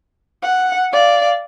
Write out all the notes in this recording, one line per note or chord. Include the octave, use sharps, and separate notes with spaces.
F#5
D5 F5